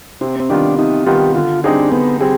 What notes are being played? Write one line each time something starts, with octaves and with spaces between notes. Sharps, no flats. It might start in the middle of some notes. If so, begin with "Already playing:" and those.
C3 C4
C4
D#3 G3 B3 D4 F4
C3 D#4
D#3 G3 B3 F4 G4
D3 F4
G3 C4 D4 D#4 G#4
D3 B3
G3 C4 G#4